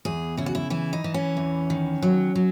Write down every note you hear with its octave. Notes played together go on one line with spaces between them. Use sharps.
E2 G#4
C#3 E4
F#4
E4
E3 E4
D#4
E3
C#4
E2
D#3
F#3
F#3